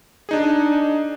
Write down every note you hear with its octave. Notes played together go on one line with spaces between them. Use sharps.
D4 D#4 G#4